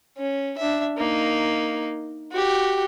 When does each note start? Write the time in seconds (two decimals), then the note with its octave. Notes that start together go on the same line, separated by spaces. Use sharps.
0.18 C#4
0.58 D4 E5
0.98 A#3 D#4
2.32 F#4 G4